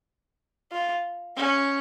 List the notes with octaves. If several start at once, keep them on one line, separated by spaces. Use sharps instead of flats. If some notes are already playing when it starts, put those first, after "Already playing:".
F4
C#4